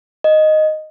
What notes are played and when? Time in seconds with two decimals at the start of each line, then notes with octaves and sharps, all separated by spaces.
0.24 D#5